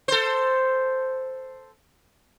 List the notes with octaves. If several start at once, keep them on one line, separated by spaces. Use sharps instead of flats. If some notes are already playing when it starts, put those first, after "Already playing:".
A4 C5